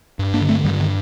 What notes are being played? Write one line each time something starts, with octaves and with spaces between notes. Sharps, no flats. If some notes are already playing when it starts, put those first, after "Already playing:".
G2
A#3 D4
D3
A3 C4
G2 D#3 G3
D#3